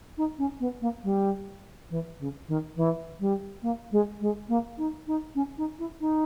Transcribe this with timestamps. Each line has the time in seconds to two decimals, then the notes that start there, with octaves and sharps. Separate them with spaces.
0.17 D#4
0.38 C#4
0.60 B3
0.81 A#3
1.03 G3
1.90 E3
2.19 C#3
2.48 D#3
2.76 E3
3.20 G3
3.62 A#3
3.91 G#3
4.20 G#3
4.48 A#3
4.77 D#4
5.07 D#4
5.35 C#4
5.57 D#4
5.78 E4
6.00 D#4